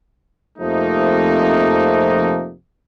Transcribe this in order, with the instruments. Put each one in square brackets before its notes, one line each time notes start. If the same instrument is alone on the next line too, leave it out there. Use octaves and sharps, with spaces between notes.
[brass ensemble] F2 C3 F3 A3 A#3 D#4